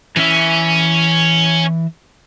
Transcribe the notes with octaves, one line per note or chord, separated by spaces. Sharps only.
E3 C#4 E5